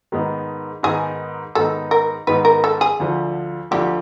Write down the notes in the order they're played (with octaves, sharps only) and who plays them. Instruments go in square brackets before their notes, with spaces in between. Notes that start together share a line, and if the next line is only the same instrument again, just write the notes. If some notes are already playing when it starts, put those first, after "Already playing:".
[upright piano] G#2 D#3 G#3 B3 D#4
[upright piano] G#2 D#3 G#3 B3 D#4 [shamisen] G#4
[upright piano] G#2 D#3 G#3 B3 D#4 [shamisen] A4
[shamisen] A#4
[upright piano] G#2 D#3 G#3 B3 D#4 [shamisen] B4
[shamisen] A#4
A4
G#4
[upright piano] D2 D3 F3
[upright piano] D2 D3 F3 [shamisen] G4